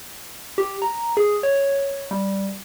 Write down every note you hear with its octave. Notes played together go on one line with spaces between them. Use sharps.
G4
A#5
G#4
C#5
G3